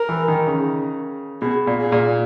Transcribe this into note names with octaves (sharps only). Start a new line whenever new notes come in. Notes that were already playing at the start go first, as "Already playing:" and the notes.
Already playing: A#4
E3
D#3
C#3
B2 G#4
A#2
G#4
A#2